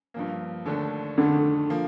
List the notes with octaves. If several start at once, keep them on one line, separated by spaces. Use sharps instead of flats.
G2 F3 A#3
D#2 D3 A3 D4
F2 D3 D#3 A3
F3 A#3